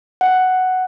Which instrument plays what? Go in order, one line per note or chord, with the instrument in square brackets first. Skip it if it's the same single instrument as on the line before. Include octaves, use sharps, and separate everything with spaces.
[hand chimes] F#5